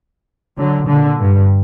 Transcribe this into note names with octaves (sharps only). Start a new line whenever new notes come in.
D3 F#3
A#2 D3
G2